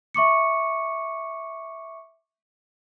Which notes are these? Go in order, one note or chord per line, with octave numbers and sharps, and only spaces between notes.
E5 C#6 D6 C#7